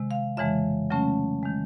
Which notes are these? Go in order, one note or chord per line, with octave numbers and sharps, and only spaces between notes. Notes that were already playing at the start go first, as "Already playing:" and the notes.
Already playing: C3 D#3 G#3
F5
F2 C#3 E3 G#3 E5
C#3 F#3 A3 C#4
D#3 G#3